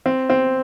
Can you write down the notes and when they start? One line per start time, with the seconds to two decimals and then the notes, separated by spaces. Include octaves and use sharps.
0.06 C4
0.30 C4